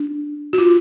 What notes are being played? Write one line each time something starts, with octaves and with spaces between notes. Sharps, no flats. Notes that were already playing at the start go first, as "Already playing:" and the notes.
Already playing: D4
F#4
F4